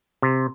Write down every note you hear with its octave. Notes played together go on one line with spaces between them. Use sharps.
C3